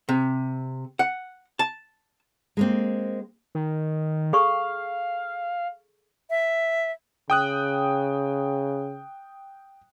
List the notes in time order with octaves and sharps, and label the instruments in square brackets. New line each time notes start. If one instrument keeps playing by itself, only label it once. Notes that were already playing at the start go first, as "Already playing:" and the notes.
[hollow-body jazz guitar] C3
F#5
A5
[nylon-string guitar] G#3 A#3 C4
[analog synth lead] D#3
[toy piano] G#4 A4 C#6 [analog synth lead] F5
[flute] E5
[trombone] C#3 [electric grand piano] G5 D#6 F#6